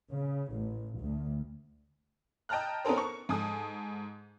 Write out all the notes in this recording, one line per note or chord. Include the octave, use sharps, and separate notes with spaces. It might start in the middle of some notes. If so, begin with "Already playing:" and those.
C#3
A1
D2
D#5 G5 A5 A#5 F6 F#6
B3 C#4 D#4 A4 A#4 C5
C#6
G#2 A4 G#5 D#6